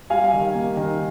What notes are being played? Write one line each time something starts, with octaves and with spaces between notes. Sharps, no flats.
G3 F5 G#5
D#3
A#3
D#3